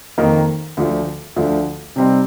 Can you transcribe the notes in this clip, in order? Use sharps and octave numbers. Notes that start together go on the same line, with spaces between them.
F2 D#3 A#3 D#4 A#4
D2 D3 F3
D2 D3 F3
C3 G3 C4 D#4